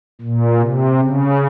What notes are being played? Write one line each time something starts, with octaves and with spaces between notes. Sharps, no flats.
A#2
C3
C#3